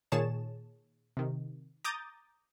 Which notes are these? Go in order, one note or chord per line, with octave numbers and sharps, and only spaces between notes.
A#2 D#3 G#4 C#5 A5 E7
C3 D#3
A#5 D6 D#6 G6 A6